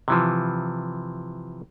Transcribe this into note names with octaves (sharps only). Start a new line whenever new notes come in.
C3 E3 F3